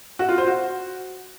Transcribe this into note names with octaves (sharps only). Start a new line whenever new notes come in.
F#4
F4
C5
F#4